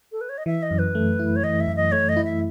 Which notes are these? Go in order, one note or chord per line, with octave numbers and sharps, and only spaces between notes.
A4
B4
C#5
D#5
E3 E5
D#5
F#2
B4
A3
E4
C#5
E3 D#5
E5
F#2
D#5
A3 C#5
D#5
E4
E5